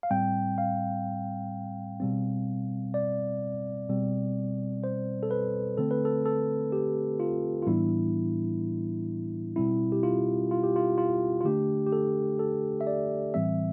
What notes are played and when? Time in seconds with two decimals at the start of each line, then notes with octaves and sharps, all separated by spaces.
0.03 F5
0.11 A2 G3 C4 G5
0.58 F5
2.00 B2 G3 C4
2.94 D5
3.89 B2 G3 C4
4.84 C5
5.23 A4
5.31 B4
5.78 D3 A3 C4 A4
5.91 B4
6.05 A4
6.26 A4
6.72 G4
7.20 F4
7.62 F4
7.67 A2 E3 G3 B3 D4 E4
9.56 B2 G3 C4 E4
9.92 G4
10.03 F4
10.51 F4
10.63 G4
10.76 F4
10.98 F4
11.41 F4
11.45 D3 A3 D4 G4
11.87 G4
11.92 A4
12.39 A4
12.81 E5
12.87 D5
13.34 A2 E3 G3 C4 E5